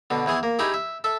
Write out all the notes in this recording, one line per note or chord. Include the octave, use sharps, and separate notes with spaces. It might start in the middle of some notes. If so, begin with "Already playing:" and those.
B2 D3
E2 E3 G#4 C6
A#3
D#4 E4 G4 G#4
E5
A4 E5